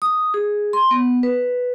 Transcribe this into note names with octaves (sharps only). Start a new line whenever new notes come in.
D#6
G#4
C6
B3
B4